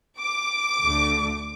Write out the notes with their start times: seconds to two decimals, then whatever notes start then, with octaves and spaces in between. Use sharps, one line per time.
0.18 D6
0.83 D2 D3 A3